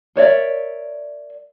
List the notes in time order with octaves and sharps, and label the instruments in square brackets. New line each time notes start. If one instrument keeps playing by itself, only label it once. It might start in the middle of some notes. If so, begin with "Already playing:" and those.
[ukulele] A#4 C#5 D5 E5